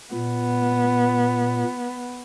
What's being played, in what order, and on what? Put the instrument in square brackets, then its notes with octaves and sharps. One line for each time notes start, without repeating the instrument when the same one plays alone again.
[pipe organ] A#2 [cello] B3